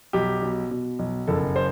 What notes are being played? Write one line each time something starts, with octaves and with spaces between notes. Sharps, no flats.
B1 G4
B2
B2
B1
F#1 A4
C5